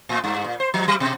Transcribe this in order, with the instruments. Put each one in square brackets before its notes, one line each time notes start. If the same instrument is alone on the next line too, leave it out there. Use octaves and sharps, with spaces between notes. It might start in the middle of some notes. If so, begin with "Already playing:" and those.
[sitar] A2
G2
A#2
C5
F3
F#3
B2